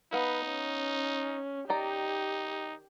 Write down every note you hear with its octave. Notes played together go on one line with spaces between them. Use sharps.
B3 D#4 B4 F5
C#4
D#3 D#4 G4 D5 A#5